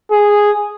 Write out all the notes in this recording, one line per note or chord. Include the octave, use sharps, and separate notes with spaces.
G#4